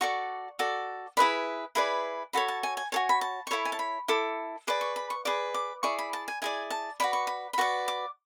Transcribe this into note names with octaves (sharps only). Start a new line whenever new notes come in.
F#4 A4 D5 C#6
F#4 A4 D5
E4 G#4 B4 D5 B5
E4 G#4 B4 D5 B5
F#4 A4 C#5 B5
A5
G#5
G#5
F#4 A4 C#5 G#5
B5
A5
C#6
E4 A4 C#5 B5
G#5
A5
B5
E4 A4 D6
G#4 B4 D5 D6
C#6
B5
C#6
G#4 B4 D5 D6
D6
E4 G#4 D5 C#6
B5
A5
G#5
E4 G#4 D5 G#5
A5
F#4 B4 D5 B5
C#6
B5
B5
F#4 B4 D5 C#6
D6